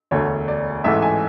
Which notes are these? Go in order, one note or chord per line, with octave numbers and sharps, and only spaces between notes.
E1 D2 D3 A3 C#5
D5
A1 G#2 E3 A3 E5
G#5